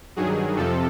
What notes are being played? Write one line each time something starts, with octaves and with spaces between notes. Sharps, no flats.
G2 D#3 F#3 G#4
F2 C3 F3 A4